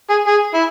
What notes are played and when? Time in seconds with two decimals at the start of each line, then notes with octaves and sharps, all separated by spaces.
0.10 G#4
0.27 G#4
0.54 E4